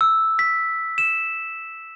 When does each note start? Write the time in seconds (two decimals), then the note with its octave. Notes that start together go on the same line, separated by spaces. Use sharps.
0.01 E6
0.39 B6
0.98 E7